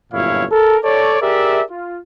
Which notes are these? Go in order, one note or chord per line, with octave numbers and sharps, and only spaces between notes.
G1 F#2 A#2 E4 C#5 F5
A4 A#4
A4 C#5 D5
G4 G#4 A#4 D5 E5
F4